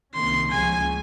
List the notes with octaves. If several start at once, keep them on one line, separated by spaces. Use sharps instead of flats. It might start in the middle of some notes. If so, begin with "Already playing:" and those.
C2 C3 D#3 A#3 C#4 C6
C#2 C#3 F3 G#3 C#4 G#5